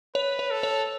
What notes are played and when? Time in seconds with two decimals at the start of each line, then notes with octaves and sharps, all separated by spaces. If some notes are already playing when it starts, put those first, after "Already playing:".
0.15 B4 C#5
0.39 C#5
0.51 A4
0.63 C#5